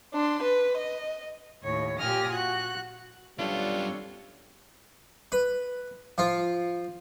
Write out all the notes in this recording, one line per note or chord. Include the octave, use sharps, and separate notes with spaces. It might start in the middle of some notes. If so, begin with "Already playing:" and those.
D4 C6
B4
D#5
D#2 A2 C#5
A#2 G4 G#5 D#6 F6 A#6
F#4 F#6
F#2 G3 B3 D4 F4 A4 C#5
B4
F3 F4